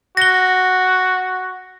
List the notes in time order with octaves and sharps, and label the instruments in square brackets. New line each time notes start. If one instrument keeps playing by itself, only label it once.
[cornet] F#4 [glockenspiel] A#6 G7